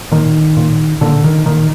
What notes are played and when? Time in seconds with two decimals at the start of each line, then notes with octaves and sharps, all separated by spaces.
0.12 A#2 D#3
0.57 A#2
1.01 A#2 D3
1.24 D#3
1.46 A#2 D#3